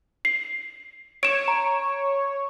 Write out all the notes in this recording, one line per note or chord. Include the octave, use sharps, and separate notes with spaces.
C7
C#5 D7 E7
A#5